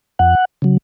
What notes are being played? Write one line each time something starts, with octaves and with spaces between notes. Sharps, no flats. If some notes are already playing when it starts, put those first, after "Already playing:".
F2 F#5
C#3 F#3